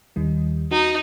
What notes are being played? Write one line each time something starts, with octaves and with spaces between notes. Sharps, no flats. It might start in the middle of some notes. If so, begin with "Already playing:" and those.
D#2 D#3 G3
D#4 F#4